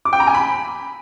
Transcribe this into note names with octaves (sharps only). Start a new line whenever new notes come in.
D6
G5
A#5
G#5
B5